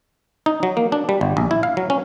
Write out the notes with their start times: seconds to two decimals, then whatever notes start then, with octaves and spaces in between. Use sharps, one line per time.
0.46 D#4
0.63 F#3
0.77 A#3
0.92 D4
1.09 G3
1.21 G1
1.37 A#1
1.51 E4
1.63 F5
1.77 F#3
1.90 C#4